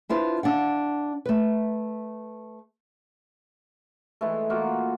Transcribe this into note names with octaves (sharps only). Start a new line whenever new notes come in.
D4 E4 F4 B4 C5
D4 F5 F#5
A3 B4
E3 G#3 A3
A#3 F4 F#4